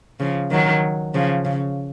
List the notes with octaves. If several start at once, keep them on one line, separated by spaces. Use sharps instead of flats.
C#3 F3
D#3 F#3
C#3 F3
C#3